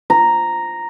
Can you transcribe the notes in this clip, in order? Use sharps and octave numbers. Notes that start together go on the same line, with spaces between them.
A#5